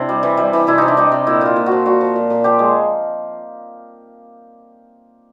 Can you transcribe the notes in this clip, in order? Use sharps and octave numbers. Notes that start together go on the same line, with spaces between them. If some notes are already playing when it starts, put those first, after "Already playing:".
Already playing: C3 D4 E4
G3
E3
G3
E3
C3 E4
C3 D#4
D4
G3 D#4
C3
A#2 E4
A#2 F4
A#2
F#4
F3
A#2 F#4
F3
A#2
A#2
F3 G4
G#3